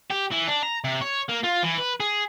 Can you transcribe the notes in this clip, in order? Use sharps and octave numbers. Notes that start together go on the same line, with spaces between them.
G4
E3
D4
A#5
C3
C#5
A#3
F4
E3
B4
G#4